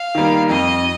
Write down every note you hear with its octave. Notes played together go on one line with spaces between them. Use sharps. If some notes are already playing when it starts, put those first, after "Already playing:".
Already playing: F5
D#3 G3 A#3
F2 D#5